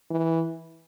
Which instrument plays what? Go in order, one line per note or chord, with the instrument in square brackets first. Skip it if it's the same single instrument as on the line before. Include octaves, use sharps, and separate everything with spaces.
[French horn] E3